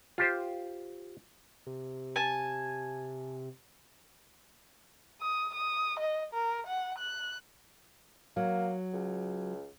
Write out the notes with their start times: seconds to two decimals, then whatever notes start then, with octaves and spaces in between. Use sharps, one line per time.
0.18 F4 G4 C5
1.67 C3
2.16 G#5 A5
5.21 D#6
5.54 D#6
5.99 D#5
6.33 A#4
6.67 F#5
6.98 F#6
8.36 F#3 A#3
8.93 C#2